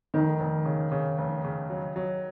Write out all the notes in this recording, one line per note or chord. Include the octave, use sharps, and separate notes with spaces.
F1 D#3
F1
C#3
C#3
F1
C#3
F#3
F#3